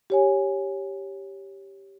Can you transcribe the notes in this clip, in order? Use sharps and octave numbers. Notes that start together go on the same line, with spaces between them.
G4 C#5 G#5